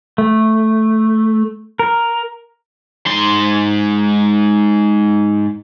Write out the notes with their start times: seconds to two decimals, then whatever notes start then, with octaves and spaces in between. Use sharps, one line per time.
0.18 A3
1.79 A#4
3.06 G#2 C6